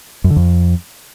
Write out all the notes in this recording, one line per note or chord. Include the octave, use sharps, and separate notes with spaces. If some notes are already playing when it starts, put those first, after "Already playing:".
F#2
D3
F2